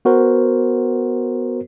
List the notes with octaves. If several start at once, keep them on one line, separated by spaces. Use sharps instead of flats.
B3 F#4 A#4 C5